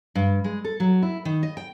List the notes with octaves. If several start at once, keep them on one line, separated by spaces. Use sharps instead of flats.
G2
G#3
A4
F#3
E4
D#3
D#5
G5